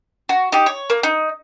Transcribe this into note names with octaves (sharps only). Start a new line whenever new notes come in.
F#4
D#4 G4
C#5
A#3
D#4